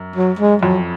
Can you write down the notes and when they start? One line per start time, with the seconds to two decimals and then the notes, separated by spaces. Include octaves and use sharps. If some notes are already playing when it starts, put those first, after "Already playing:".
Already playing: F#2
0.16 F#3
0.39 G#3
0.62 F2 F#3